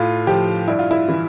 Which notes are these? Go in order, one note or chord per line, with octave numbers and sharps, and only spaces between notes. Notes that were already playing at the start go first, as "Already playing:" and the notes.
Already playing: A2 F4
F3 G4
G2 E4
F4
E4
E3